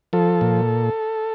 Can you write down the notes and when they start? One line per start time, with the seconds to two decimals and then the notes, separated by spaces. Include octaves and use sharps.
0.13 F3 A4
0.41 A#2